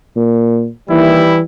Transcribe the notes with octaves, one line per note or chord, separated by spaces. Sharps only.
A#2
D#2 E3 G3 E4